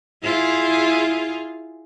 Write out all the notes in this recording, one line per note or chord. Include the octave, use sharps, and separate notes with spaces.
E4 F4 G#4